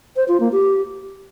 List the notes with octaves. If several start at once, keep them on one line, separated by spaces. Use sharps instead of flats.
C5
F4
A#3
G4